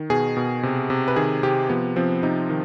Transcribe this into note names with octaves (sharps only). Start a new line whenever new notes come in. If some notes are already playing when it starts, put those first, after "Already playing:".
Already playing: D#3
B2 G#4
B2
C3
C3
B4
D#3 G#4
C3 G4
F3 B3
F3 C4
C3 D#4
D#3